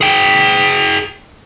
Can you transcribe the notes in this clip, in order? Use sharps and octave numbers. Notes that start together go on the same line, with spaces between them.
G#4 G5